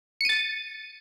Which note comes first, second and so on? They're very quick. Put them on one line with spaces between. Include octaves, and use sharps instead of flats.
C#7 D#7 A6